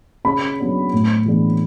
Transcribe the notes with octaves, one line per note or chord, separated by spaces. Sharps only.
C#3 B5
F#3 B3 D4
A2
E3 G#3 B3 D4